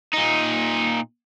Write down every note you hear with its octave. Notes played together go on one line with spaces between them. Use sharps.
A#2 D#4